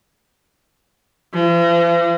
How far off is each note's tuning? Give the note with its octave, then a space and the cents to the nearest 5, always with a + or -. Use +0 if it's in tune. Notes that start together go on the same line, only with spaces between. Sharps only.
F3 -45